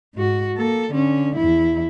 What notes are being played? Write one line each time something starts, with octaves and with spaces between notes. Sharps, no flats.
G#2 F#4
A#3 A4
D3 C#4
E2 E4